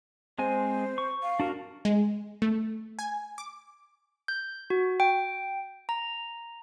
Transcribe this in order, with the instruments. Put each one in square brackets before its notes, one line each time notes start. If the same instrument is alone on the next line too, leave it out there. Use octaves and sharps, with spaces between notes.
[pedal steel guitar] G#3 C4 G#5 [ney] C5
[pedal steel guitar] C#6
[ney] F5
[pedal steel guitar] D4 F#4 A#4
[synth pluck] G#3
A3
G#5
D6
[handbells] G6
F#4
G5
A#5